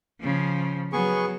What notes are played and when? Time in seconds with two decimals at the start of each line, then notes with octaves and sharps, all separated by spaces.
0.20 C#3 F3
0.93 F#3 B3 G#4 C#6